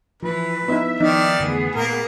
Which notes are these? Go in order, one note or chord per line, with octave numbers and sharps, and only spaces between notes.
E3 F3 B4
B3 D#4 E4 E5
D#3 F3 B3 D#4 D5
F2 D3 E3 A3 B3 G#4
A#2 A#3 A#4